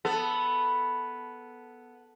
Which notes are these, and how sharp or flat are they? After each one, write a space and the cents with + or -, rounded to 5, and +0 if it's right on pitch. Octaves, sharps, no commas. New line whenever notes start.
B3 +0 A4 +0